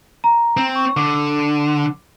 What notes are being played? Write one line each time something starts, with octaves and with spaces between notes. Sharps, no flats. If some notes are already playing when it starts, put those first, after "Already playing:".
A#5
C4
C#6
D3 D6